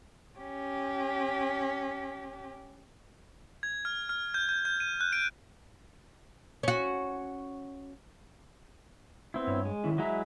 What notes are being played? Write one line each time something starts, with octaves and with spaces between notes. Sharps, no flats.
C#4 G4
G#6
F6
F6
G6
G6
G6
D#7
F#6
D7
C#4 F#4
B3 C4 E4
G2 C#5
G#3
D#3 C#4 E4
F#3 G#3 E4 D#5 E5 A#5